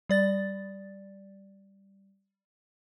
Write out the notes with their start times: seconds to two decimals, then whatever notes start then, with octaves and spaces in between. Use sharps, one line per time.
0.09 G3 D5 A6